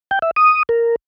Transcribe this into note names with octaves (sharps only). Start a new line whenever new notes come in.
G5
E5
D#6
A#4